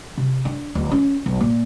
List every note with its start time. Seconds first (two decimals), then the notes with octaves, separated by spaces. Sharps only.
0.17 C3
0.45 D4
0.75 D1
0.92 C#4
1.26 B1
1.40 A#2